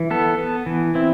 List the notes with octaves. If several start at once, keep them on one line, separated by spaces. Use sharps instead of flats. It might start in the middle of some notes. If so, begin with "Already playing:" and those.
Already playing: E3
B3 A4
B3
E3
C4 E4